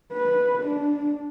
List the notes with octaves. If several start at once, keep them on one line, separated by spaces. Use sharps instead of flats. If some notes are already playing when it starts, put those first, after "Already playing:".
B4
D4